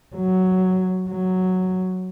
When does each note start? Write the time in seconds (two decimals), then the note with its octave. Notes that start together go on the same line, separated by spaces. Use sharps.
0.16 F#3
1.09 F#3